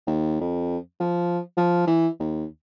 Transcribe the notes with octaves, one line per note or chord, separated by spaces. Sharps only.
D#2
F2
F3
F3
E3
D#2